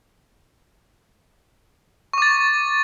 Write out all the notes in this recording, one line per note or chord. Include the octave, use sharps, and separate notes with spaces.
C#6 D6 A6